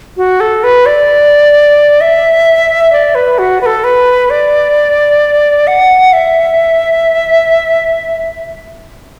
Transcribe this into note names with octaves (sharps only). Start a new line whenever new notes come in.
F#4
A4
B4
D5
E5
D5
B4
F#4
B4
A4
B4
D5
F#5
E5